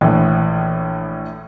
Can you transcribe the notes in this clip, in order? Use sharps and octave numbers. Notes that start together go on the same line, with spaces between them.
A#1 A2 E3